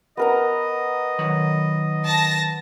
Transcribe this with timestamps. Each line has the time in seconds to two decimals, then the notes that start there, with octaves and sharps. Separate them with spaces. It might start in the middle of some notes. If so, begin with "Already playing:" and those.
0.17 B3 A#4 D#5 A#5
1.19 D#3 F#3 F#5
2.06 A5 A#6